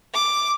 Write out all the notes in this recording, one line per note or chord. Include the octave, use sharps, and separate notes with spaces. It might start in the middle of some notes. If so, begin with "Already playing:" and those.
D6